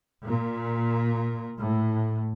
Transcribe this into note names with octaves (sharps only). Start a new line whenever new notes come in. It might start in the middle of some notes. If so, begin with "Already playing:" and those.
A#2
A2